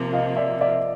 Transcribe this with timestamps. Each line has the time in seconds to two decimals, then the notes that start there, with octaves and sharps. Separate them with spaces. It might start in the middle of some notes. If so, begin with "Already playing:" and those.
Already playing: C3 F3 A#3
0.13 D#5 F5
0.36 D5 E5
0.61 D5 E5